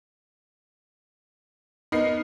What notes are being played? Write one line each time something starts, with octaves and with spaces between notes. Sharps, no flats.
B3 D#4 A#4 C7